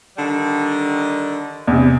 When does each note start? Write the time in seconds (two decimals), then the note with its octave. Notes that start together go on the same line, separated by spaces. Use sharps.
0.17 D3 D#3 G3
1.67 E2 C3